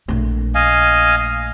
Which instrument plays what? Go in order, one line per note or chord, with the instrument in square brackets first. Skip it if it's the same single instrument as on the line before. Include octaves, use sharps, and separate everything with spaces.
[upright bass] A#1 A3
[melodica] D#5 F5 G#5